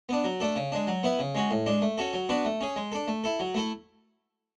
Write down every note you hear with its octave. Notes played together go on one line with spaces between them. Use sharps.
B3 D4
F#3
A3 D4 A4
C#3
G#3 D4
F#3
B3 E4 B4
C#3
G#3 C#4 F#4
A2
G#3 D4
A3
C#4 F#4 A4
F#3
B3 D4 F#4 B4
A3
C#4 G#4
G#3
D4 A4
A3
E4 A4
F#3
A3 E4 A4